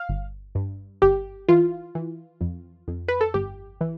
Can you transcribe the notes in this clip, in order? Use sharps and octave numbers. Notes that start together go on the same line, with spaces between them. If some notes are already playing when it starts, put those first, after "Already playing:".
Already playing: F5
G1
G2
G1 G4
E3 F4
E3
F2
F2
B4
A4
G1 G4
E3